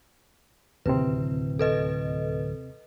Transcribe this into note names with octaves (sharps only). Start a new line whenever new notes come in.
D1 D#2 C3 C4 B4
A4 B4 D#5